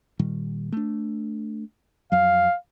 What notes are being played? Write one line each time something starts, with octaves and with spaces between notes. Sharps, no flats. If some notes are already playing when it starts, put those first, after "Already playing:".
A#2 D#3 G3
A3 D4
F2 F#3 F5